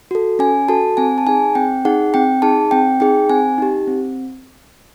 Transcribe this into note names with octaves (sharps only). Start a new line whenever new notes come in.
F#4 A4
C#4 G#5
F#4 A4 A5
C4 G#5
A5
D#4 G#4 G#5
C4 G5
D#4 G#4 F#5
C4 G5
D#4 G#4 A5
C4 G5
D#4 G#4 G5
C4 G#5
D#4 G4
C4